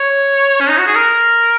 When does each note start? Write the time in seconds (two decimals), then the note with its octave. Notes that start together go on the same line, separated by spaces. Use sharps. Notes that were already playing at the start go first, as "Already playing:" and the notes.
Already playing: C#5
0.61 C#4
0.69 D#4
0.78 F#4
0.87 G#4
0.96 A#4